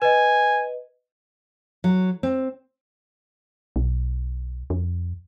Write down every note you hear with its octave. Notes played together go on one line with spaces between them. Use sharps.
B4 D#5 G#5
F#3
C4
B1
F2